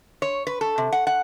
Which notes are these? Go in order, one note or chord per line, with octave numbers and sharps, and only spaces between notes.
C#5
B4
A4
C3
F#5
F#5